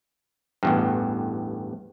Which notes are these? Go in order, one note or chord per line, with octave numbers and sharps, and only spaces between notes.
A1 E2 G2